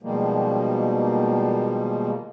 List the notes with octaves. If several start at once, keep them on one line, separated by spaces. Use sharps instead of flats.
B2 D#3 F3 G3 G#3 A#3